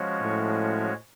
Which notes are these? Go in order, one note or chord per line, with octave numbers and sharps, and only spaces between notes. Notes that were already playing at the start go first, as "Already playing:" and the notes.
Already playing: F3 G#3 C#4 F#4 C#5
A2